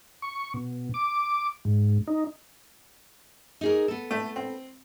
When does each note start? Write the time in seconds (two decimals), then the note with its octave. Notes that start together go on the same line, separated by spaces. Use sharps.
0.22 C#6
0.54 B2
0.94 D6
1.65 G#2
2.08 D#4
3.61 D#4 G#4 A#4
3.88 B3 A4
4.11 A3
4.36 C4